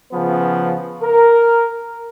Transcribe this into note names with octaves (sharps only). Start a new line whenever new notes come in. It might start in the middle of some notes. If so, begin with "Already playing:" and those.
C#3 F3 B3 B4
A#4